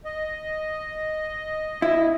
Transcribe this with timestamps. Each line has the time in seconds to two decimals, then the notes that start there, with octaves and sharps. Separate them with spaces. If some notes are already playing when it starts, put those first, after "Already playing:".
0.05 D#5
1.82 E4